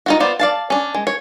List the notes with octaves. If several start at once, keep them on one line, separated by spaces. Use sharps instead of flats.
D#4 F4 F#4
B3 F4 C5 D5
D5 F5 A5
C#4 D4
G#3
C#5